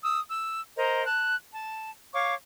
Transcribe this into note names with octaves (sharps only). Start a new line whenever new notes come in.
D#6 E6
E6
A#4 C5 D#5 A#5
A5 F#6
A5
C#5 F5 C#6 D6